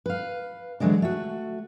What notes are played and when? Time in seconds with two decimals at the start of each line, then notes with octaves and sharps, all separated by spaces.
0.06 B4 F5
0.80 D3 E3 F#3 G#3 D4
1.02 A3 F#4